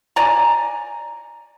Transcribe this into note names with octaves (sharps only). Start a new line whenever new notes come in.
D5 G#5 A#5